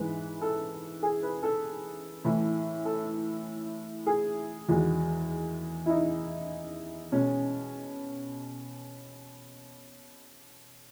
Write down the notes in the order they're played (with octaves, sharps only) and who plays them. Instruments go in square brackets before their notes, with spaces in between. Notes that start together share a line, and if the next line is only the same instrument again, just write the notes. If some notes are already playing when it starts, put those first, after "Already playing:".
Already playing: [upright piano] G#2 E3 G#3 B4
A4
G#4
B4
A4
A2 E3 A3
A4
G#4
E2 D#3 G#3 F#4
E4
D#4
B2 G#3 C#4